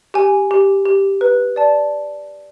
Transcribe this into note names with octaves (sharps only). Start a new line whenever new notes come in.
G4 G#5
G4
G4
B4
D5 A5